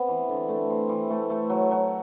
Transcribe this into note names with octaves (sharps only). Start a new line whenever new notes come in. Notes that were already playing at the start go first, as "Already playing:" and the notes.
Already playing: B3 C4
E3
D3
A3
C4
E3
A3
A3
F#3
F#3